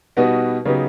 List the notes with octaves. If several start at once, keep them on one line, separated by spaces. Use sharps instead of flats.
B2 G3 B3 D#4 F#4
C#3 F#3 B3 D#4 G4